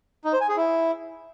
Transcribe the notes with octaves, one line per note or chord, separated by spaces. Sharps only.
D#4
C5
G#5
G#4
E4